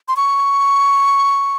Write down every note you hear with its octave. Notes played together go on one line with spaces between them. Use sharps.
C6
C#6